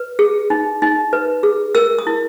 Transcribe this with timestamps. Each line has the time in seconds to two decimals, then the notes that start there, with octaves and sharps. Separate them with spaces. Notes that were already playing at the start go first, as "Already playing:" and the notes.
Already playing: B4
0.19 G#4
0.50 D#4
0.82 D#4
1.13 B4
1.43 G#4
1.75 A#4 E6
1.99 D#6
2.07 E4